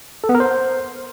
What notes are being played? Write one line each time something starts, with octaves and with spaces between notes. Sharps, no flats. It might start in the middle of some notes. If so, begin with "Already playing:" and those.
A4
B3
A#4
C5